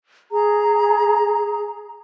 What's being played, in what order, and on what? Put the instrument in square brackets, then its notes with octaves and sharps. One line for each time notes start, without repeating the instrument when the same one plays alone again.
[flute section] G#4 A#5